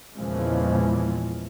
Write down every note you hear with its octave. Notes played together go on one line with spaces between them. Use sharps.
E2 A#2 C#3 E3 F3 G#3